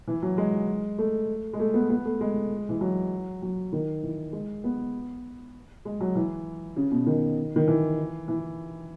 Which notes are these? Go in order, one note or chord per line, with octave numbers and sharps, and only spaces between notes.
E3
F#3
G#3
A3
G#3
A3
B3
B3
A3
G#3
E3
F#3
F#3
D#3
E3
G#3
B3
G#3
F#3
E3
C#3
B2
D#3
D#3
E3
E3